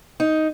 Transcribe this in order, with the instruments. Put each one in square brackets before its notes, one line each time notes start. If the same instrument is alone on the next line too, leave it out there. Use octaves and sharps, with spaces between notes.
[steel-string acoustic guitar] D#4